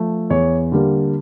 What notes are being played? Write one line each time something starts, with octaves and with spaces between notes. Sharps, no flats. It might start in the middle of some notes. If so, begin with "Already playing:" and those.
Already playing: F3 A3
E2 C#5
D3 G3 A#3